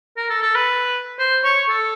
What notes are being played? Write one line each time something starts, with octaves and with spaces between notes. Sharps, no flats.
A#4
A4
A4
B4
C5
C#5
A4